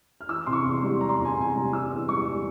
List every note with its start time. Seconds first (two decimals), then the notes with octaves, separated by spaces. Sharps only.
0.21 F6
0.29 E3 E6
0.46 C3 C6
0.53 C#6
0.65 E2
0.77 C6
0.83 G3
1.01 G3 A#5
1.09 C6
1.17 E2 A#5
1.25 G#5
1.37 C3 G#5
1.49 A#5
1.54 G3
1.72 E3 E6
1.91 E2
2.09 G3 C#6
2.26 G3